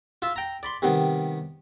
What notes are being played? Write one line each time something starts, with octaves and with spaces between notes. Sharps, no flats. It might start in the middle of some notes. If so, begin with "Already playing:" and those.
F4 E5
G5 A#5
D5 B5 C6
C3 D#3 G3 B3